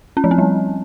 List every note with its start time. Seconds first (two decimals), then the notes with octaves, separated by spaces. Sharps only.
0.17 C#4
0.24 F3
0.31 C4
0.38 G3